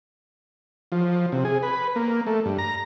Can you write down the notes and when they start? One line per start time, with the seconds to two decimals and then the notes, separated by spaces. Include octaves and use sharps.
0.92 F3
1.32 C3
1.45 G#4
1.63 B4
1.96 A#3
2.27 A3
2.45 G2
2.58 A#5